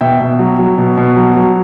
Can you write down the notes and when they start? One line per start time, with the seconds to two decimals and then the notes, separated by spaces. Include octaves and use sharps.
0.01 B2 E5 G5
0.20 B2
0.39 F#3
0.59 F#3
0.78 B2
0.97 B2
1.16 F#3
1.36 F#3